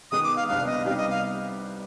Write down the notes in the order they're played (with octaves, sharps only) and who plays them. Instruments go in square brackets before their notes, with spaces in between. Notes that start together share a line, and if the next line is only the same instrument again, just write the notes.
[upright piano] D#3 G#3 B3 [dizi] D#6
[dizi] D6
F5
[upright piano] C2 C3 G3 B3 D4 [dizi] F5
[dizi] D#5
[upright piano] C3 G3 B3 D#4 G4 [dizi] F5
[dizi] D#5
F5